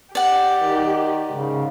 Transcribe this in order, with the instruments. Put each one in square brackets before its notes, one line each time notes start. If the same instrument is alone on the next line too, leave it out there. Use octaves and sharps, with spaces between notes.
[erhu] G4 [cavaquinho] D5 F#5
[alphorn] D#3
[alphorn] G#2 [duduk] C#3